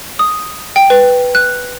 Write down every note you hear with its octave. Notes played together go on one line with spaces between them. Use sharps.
D#6
G5
B4
F#6